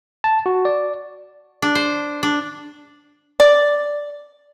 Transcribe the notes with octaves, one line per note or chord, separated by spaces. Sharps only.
A5
F#4
D5
D4
C5
D4
D5